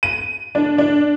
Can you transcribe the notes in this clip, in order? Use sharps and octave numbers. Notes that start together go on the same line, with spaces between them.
D#7
D4
D4